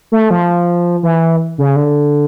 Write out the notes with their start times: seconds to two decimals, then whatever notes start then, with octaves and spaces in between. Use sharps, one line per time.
0.12 A3
0.31 F3
1.03 E3
1.58 C#3
1.76 D3